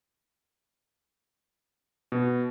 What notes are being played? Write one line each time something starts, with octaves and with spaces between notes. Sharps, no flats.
B2